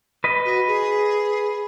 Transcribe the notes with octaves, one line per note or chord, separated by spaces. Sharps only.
B4 D#5
F#4
G#4